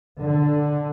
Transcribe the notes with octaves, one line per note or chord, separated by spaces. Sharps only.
D3